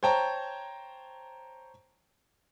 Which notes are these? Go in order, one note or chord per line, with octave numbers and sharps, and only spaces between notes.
C5 C#5 G5 A5 A#5